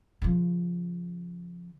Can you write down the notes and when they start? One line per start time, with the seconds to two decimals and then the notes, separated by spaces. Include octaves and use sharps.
0.22 C#3 F3